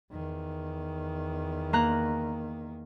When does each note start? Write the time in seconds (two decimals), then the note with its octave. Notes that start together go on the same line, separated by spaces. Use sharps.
0.12 E2 D#3
1.73 A#3 A#5 F#6